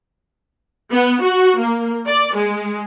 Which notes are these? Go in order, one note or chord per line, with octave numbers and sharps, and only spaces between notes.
B3
F#4
A#3
D5
G#3